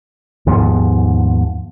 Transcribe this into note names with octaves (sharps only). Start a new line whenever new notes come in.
D#2 G#2 F3 B3